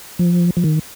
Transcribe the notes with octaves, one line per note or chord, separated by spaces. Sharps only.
F3
F3
D#3